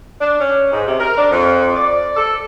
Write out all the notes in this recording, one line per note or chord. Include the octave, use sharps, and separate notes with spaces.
D4
C#4
G#2
C3
A#4
D4
F2
D5
A4